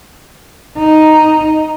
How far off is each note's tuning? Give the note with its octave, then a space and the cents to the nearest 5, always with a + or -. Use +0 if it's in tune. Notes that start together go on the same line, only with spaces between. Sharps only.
D#4 +0